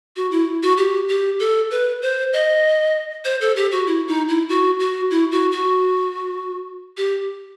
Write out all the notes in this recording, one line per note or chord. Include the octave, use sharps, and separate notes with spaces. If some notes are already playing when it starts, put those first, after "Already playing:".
F#4
E4
F#4
G4
G4
A4
B4
C5
D#5
C5
A4
G4
F#4
E4
D#4
E4
F#4
F#4
E4
F#4
F#4
G4